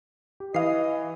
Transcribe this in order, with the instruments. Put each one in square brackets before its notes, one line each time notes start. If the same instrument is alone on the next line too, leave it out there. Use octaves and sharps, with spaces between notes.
[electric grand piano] G4
[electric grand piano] E3 [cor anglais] D#5 [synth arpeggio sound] F5 C7